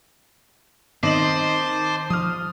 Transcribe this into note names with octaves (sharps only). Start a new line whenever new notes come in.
D#3 C4 C5 D#5 A5 D6 F#7
F3 D#6 F6